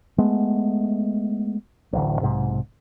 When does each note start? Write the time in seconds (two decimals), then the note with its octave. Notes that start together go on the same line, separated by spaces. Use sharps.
0.18 G#3 A3 B3
1.93 D1 A1 D2
2.21 B1 G#2 C3